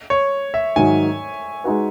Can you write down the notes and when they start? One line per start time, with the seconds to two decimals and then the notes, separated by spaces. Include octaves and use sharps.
0.10 C#5
0.54 E5
0.76 G#2 D#3 F#3 G#5
1.64 G#3 D#4 F#4 B4